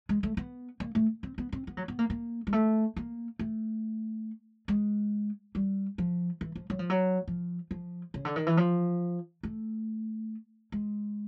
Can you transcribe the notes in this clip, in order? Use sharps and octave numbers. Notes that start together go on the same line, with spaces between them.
G#3
A3
B3
A#3
A3
C4
B3
C4
B3
F#3
B3
A#3
A#3
G#3
A3
A#3
A3
G#3
G3
F3
E3
F3
F#3
F3
F#3
F3
F3
C#3
D3
D#3
E3
F3
A3
G#3